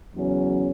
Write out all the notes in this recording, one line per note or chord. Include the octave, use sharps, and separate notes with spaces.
E2 C#3 F#3 C#4